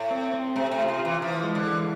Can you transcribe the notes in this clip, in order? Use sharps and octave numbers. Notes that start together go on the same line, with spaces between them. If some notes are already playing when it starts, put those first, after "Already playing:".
Already playing: A2
C4
C4
C3 A3
C3
F4
C3
F4
E3
E3 F3
G#3
D3
E3